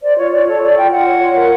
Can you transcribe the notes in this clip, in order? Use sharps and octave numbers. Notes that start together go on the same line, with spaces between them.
C5 D5
F4 C#5
F4 D5
A4 C#5
A4 D5
F4 G5
F4 F#5
C#5
F4
A#4